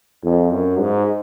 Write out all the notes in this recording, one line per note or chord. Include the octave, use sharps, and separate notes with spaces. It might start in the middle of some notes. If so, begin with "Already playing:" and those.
F2
F#2
G#2